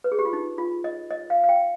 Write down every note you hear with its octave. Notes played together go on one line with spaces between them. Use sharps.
B4
G#4
G4
F4
D#4
F4
D#5
D#5
F5
F5
G5